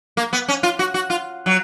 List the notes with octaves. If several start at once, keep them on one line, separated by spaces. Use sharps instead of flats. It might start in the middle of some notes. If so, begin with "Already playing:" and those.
A#3
B3
C#4
F4
F#4
F#4
F4
F#3